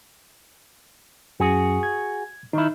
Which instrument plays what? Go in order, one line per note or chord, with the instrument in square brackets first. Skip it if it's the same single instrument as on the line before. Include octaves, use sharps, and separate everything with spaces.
[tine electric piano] F#2 [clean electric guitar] F#4 G#4
[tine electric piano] G#6
[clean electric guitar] D#3 E4 [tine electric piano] D#4